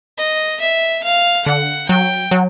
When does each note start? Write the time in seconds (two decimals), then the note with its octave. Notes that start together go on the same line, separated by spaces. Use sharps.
0.18 D#5
0.61 E5
1.04 F5
1.46 D3 F#5
1.89 F#3 G5
2.31 F#3